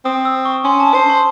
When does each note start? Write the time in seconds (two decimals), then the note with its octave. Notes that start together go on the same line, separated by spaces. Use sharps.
0.05 C4 D#6
0.25 E6
0.45 C#6
0.64 C#4 C6
0.80 A5
0.94 C5 A5
1.10 C6